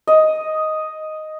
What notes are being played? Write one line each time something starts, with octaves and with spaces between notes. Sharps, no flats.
D#5